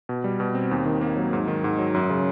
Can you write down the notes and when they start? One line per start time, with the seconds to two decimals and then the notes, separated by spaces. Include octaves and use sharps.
0.09 B2
0.24 G3
0.40 B2
0.55 C4
0.71 D#2
0.86 D#3
1.01 A#3
1.17 F#3
1.33 G#2
1.48 D#3
1.64 G#2
1.79 F#3
1.94 F#2
2.10 C#3